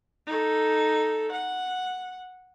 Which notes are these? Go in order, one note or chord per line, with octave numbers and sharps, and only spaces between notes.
D#4 A4
F#5